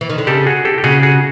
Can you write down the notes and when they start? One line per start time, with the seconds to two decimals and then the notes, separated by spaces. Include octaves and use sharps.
0.01 E3
0.09 D#3
0.18 D3
0.27 C#3 G4 A4
0.46 F#4 G#4
0.65 G4 A4
0.78 G4
0.84 C#3 F#4 G#4
1.03 F#4 G#4